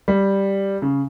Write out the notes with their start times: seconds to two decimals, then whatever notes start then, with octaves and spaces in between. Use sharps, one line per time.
0.08 G3
0.82 C#3